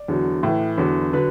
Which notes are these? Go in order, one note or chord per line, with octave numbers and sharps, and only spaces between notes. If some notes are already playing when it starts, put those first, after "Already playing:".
Already playing: D5
E2 D3 F#3
A2 E3
E2 D3 F#3
D3 F#3 B4